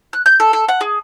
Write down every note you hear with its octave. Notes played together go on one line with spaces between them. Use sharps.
F#6
G6
A4
A4
F#5
G#4